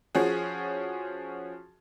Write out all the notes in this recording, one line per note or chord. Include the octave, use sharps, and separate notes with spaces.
F3 C#4 F#4 G#4